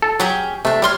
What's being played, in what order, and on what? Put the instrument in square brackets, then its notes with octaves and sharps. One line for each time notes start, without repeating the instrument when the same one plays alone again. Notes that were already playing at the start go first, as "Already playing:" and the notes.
[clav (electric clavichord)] A4 A5
[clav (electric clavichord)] F#3 [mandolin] C#4 G4 G#4
[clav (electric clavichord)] C3 A3 [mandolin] D4 E5
[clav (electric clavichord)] G3 [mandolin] C#5 C6 F6